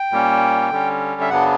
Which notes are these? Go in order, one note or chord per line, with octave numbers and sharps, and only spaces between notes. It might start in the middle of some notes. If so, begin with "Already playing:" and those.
Already playing: G5
A#2 G3 A#3 C#4
D3 G3 C#4
E5
F#2 C#3 F#3 B3 D4 F#5